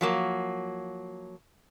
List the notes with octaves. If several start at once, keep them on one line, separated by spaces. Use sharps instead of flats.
F3 F#3 A#3